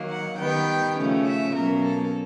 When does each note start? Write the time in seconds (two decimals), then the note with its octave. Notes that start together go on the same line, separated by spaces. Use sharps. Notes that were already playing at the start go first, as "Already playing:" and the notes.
Already playing: D#3 F#3 A#3
0.09 F#5
0.38 D#3 G3 B3 G5
0.96 C#3 F3 A3 C#4
1.26 E5
1.54 B2 F#3 A#3 C#4 A#4
1.84 A4